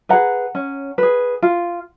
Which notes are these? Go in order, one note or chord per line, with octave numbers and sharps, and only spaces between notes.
G#4 B4 F#5 A#5
C#4
G#4 B4
F4